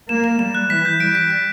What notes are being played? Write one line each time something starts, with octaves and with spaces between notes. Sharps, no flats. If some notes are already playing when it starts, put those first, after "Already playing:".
A#3 E7
E7
G3 E7
F#6
E3 B6
G6
G3 D7
B6
B6